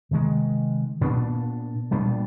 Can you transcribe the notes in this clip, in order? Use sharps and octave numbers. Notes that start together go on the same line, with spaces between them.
C3 D#3 G#3
A#2 G3 B3 D4
A#2 G3 B3 D4